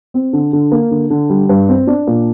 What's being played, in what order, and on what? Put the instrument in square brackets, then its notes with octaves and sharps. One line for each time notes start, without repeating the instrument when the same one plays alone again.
[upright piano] C4
D3
D3
A#3
D3
D3
G3
G2
C4
D4
A#2